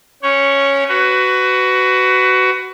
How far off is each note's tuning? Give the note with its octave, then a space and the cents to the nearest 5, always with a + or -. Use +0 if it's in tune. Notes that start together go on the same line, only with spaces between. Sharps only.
C#4 +0 C#5 +0 F#5 +45
F#4 +15 B4 +20